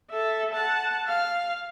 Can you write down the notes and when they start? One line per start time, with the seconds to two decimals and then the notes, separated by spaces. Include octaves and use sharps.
0.11 A4 E5
0.54 F#5 A5
1.08 F5